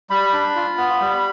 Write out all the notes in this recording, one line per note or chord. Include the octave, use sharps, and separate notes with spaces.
G3 B5
D4
F4
B3
G3